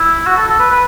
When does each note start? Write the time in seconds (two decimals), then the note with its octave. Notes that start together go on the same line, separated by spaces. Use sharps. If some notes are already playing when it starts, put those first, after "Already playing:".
Already playing: E4
0.26 F#4
0.37 A4
0.48 A4
0.59 B4
0.70 B4